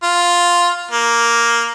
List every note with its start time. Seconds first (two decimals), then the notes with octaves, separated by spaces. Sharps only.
0.03 F4
0.91 A#3